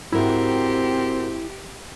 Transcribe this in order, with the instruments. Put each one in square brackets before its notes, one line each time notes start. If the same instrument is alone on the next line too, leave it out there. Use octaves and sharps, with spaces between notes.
[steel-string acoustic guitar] G#2 F#4 A#4 [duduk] C4 [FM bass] E4 [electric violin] G4